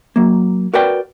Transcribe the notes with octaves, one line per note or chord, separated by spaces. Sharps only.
F#3 A#3
F#4 A#4 B4 D5 G5